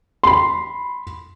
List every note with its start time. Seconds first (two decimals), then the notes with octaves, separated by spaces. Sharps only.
0.23 B5 C6